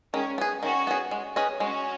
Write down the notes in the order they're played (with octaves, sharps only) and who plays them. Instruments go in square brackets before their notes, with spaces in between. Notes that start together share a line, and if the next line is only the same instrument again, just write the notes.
[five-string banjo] D#3 [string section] G#3 C#4
[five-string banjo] B3 G#4
[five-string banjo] D#3 [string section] C#4 F#4
[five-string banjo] B3 G#4
G#3
C#4 G#4 B4 D#5
[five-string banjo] G#3 [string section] C#4 F#4